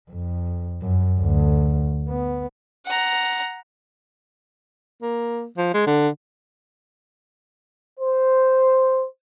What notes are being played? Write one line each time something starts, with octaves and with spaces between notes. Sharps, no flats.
F2
F#2
D2
B3
F#5 A#5
A#3
F3
G#3
D3
C5